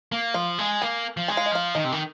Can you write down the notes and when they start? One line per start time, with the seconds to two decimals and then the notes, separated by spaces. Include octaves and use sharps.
0.12 A#3
0.34 F3 F5
0.58 G#3
0.82 A#3 G#5
1.17 F3
1.28 G#3 G#5
1.37 F5
1.46 D#5
1.51 F3 F5
1.75 D#3 D#5
1.84 C3
1.92 D#3